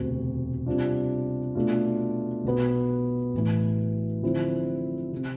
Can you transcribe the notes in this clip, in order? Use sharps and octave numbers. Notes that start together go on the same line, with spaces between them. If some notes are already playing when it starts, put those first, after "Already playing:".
Already playing: E1 D2 C3
C3 G3 D4 F4
B2 A3 D4 F4
B1 B2 B3
A1 A2 E3
D3 F3 C4 E4
C3